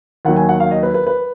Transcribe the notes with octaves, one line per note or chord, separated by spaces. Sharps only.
D#2 D#3 F#3 F#5
G#5
F#5
F5
D#5
B4
B4
B4